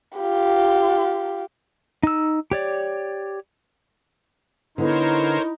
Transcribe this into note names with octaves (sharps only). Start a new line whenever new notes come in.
F4 G4
D#4 E6
G4 C#5 D5
D3 B3 D#4 E4 A#4 C5 C#5